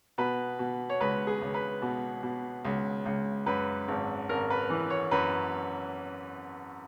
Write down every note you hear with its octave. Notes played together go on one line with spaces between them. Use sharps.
B2 B4
B2
C#5
C#2 B4
G#4
C#2
B4
B2
B2
C#2
C#2
F#2 B4
G#1
G#1 A#4
B4
E3
C#5
F#2 B4